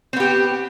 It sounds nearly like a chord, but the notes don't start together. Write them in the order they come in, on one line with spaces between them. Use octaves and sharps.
C4 B3 G4